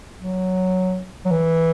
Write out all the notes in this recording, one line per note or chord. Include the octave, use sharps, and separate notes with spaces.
F#3
F#3
E3